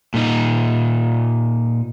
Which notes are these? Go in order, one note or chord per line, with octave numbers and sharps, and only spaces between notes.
A#2 D#4